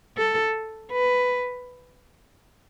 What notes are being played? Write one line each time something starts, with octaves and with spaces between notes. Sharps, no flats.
A4
B4